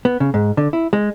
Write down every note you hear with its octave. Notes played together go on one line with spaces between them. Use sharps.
B3
C#3
G#2
D3
E4
G#3